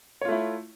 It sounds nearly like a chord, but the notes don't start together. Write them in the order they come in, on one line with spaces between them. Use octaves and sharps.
C#5 F4 A3 E4